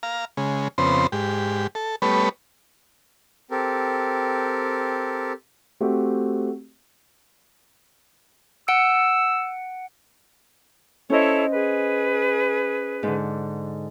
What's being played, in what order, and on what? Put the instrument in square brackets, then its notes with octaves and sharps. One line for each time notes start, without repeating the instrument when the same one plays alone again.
[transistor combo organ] F5 A#5
C#3 G#3
F2 C#3 B3 C4 C5
G#2 G4
A4
G3 A3 B3 B4 C#5
[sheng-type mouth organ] C4 G4 A4 A#4
[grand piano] A3 C4 F#4 G4
[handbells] F#5 C#7 D7 [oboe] E6
[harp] C#4 C5 D#5 [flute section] E4 A4 C#5
[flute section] G#4 B4
[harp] G#2 D3